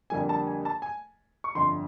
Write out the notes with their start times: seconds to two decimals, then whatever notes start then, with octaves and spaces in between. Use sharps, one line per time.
0.10 F2 D3 G3 A#3 G#5
0.29 A5
0.47 G#5
0.65 A5
0.82 G#5
1.44 C#6
1.55 G1 F2 D3 C6